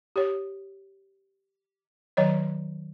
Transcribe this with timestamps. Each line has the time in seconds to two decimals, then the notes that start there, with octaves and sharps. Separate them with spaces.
0.16 G4 C#5
2.17 D#3 F#3 C#5 D#5